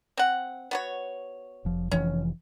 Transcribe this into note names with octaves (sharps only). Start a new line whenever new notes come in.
C4 F#5
B3 F#4 C#5
F1 F3
F1 E3 F3 C#4